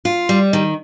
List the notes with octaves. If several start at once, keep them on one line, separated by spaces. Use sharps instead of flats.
F4
G3
D#3